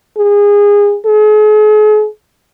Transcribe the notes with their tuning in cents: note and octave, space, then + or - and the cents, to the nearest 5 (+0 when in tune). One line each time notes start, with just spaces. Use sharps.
G#4 -25
G#4 +40